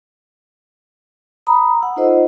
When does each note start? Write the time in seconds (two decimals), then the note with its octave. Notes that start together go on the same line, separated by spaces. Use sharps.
1.47 A#5 B5 D#6
1.81 F#5 E6
1.96 D#4 F4 A4 C5 D#5